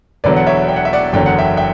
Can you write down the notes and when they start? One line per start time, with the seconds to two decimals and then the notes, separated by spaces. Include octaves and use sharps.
0.24 E1 E2 D3 F#3 B4 D5
0.36 F#5
0.47 C#5 E5
0.68 G5
0.76 F#5
0.85 E5
0.93 D5 F#5
1.13 F#1 E2 D3 F#3 G5
1.26 F#5
1.38 E5 G5
1.57 E5 G5